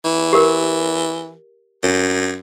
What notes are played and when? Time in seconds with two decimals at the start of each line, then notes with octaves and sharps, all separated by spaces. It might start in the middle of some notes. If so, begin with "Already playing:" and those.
0.05 E3
0.33 G4 A#4
1.83 F#2